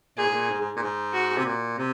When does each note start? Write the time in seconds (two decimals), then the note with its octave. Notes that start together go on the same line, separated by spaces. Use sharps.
0.17 A#2 G#4
0.25 G#2
0.32 A#2
0.49 G#2
0.60 G#2
0.76 A#2
0.81 G#2
1.13 F#4
1.37 C3
1.45 A#2
1.78 C3